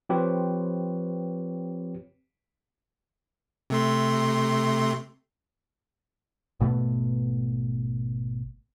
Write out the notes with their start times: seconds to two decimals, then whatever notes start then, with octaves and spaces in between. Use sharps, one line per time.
0.09 F3 C4 G4 B4 C#5
3.70 C3 A3 C6
6.60 G#1 B2 A3 B3